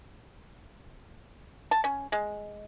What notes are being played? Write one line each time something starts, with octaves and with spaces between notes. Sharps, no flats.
A5
C#4
G#3